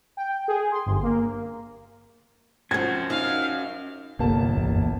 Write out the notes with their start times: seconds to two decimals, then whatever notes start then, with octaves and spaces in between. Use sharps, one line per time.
0.17 G5
0.48 G#4
0.72 C6
0.86 G1
1.03 A#3
2.71 F3 C4 C#4 F#4 G#6
3.10 D#4 F5
4.19 G1 C2 A#3 A5
4.53 F#1 E2 A#2